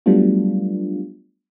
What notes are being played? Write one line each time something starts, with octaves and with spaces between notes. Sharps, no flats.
F#3 G3 A3 B3 D4 F4